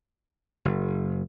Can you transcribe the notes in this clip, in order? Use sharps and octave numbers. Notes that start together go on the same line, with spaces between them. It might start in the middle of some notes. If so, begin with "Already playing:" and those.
F#1